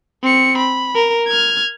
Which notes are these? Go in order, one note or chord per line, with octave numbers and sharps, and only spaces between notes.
C4 C#7
B5
A#4
F6 G#6